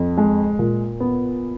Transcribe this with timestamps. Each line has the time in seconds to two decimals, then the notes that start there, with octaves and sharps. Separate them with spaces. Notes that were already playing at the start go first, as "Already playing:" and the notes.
Already playing: F2
0.17 G#3
0.59 A#2
1.00 B3